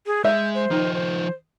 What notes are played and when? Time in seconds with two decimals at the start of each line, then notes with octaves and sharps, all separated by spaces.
0.07 G#4
0.25 G#3 E5 G6
0.54 C5
0.71 D#3 F3 D#4
0.94 C5